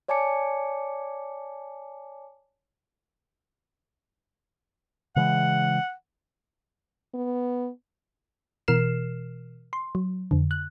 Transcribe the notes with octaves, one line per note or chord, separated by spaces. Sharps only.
C#5 D5 G#5 A5 D6 C#7
C#3 E3 G#3 F#5
B3
B2 E3 A#4 F6 C7 E7
C6
F#3
F2 D3
F#6